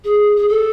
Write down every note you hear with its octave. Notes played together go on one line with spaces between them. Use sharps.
G#4
G#4
A4